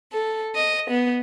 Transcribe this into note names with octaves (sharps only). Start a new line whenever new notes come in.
A4
D#5
B3